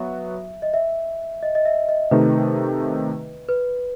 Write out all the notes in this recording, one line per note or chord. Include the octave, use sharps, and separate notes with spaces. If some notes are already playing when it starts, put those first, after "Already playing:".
Already playing: F#3 B3 F#4 E5
D#5
E5
D#5
D#5
E5
D#5
C3 D#3 A3 D#4 B4
B4